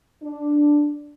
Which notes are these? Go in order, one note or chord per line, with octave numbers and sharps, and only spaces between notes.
D4